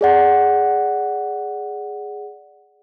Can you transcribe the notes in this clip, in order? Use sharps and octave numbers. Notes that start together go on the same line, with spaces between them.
G#4 D5 F#5